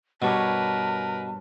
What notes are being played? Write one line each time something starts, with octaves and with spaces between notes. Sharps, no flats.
G2 B2 A#4 B4 C#5 A5 D6